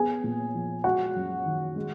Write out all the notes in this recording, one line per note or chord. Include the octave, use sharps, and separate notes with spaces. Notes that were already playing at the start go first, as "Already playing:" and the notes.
Already playing: B3 G#4 G#5
A#2
F3
G#3 F#4 F#5
F#2
D#3
G#3